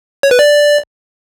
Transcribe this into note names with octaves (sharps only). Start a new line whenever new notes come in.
C#5
B4
D5